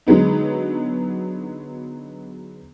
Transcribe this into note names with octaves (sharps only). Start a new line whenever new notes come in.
D3 F#3 G#3 B3 D#4